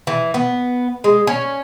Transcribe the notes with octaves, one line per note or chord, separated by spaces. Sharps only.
E3
B3
G#3
C#4